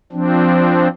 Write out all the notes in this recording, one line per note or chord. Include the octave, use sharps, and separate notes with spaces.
F3 C4 D4